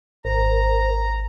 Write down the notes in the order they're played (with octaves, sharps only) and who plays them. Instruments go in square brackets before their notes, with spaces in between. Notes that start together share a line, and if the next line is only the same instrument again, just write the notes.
[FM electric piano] G#1 [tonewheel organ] A#4 C5 [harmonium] A#5